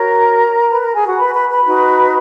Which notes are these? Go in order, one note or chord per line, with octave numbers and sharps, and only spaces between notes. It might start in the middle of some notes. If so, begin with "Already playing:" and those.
Already playing: F#4 A#4 C#5 A#5
B4 B5
A#4 A#5
G#4 G#5
F#4 F#5
B4 B5
B4 B5
B4 B5
D#4 F#4 B4